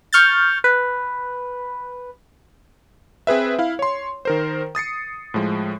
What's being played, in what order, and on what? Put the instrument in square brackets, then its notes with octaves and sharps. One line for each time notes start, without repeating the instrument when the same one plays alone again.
[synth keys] C#6 F6 G6 A6
B4
[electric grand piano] C4 G#4 B4 E5
E4 F5
C#5 C6
D#3 A#4 C5
D#6 A6 C7 C#7
A2 F3 G#3